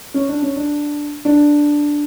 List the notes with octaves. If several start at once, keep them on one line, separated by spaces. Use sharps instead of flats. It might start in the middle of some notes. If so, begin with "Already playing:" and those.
C#4
D4
C#4
D4
D4